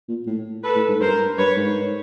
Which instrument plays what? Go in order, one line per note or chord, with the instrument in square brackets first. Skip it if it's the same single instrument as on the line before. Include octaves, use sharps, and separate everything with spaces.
[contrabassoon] A#2
A2
[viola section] A4 B4
[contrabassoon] A2
G#2
[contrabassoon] G2 [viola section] A#4 C5
[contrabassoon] G2 [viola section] B4 C#5
[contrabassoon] G#2